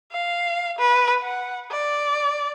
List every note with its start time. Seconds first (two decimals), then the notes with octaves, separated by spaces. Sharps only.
0.12 F5
0.79 B4
1.23 F#5
1.71 D5